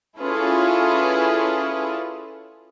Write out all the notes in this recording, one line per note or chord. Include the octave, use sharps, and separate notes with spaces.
C#4 E4 F4 G#4 A4 B4